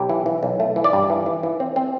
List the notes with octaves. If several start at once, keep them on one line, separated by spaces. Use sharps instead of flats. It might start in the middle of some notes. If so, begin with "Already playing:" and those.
Already playing: B1 G4
E3
E3
B1
A3
E3
D5
G2
E3
E3
E3
C4
C4